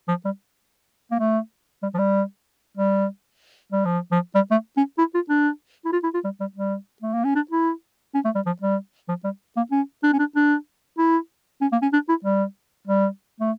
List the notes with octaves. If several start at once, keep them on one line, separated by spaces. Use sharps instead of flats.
F3
G3
A#3
A3
G3
F3
G3
G3
G3
F3
F3
G3
A3
C#4
E4
F4
D4
E4
F4
E4
F4
G3
G3
G3
A3
A#3
C#4
D4
E4
C#4
A3
G3
F3
G3
F3
G3
A#3
C#4
D4
C#4
D4
D4
E4
C#4
A#3
C#4
D4
E4
G3
G3
A3